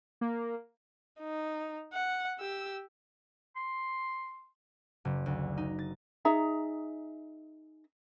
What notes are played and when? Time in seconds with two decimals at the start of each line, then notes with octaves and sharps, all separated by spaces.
0.21 A#3
1.20 D#4
1.93 F#5
2.39 G4 E6
3.56 C6
5.05 F#1
5.26 D2
5.57 D#4
5.79 A6
6.25 D#4 G#4 E5 A#5